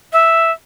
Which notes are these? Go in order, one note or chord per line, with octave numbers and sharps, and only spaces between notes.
E5